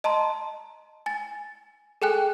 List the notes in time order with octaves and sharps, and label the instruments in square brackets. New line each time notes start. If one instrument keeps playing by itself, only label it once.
[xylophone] D#5 A5 A#5 C6
G#5 A6
G#4 A4 G5 G#5 F#6